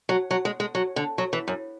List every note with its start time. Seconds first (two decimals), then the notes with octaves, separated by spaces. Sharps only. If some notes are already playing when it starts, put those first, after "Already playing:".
0.09 F#3
0.31 F#3
0.45 G#3
0.60 G#3
0.75 F#3
0.96 D3
1.18 F#3
1.33 E3
1.48 F#2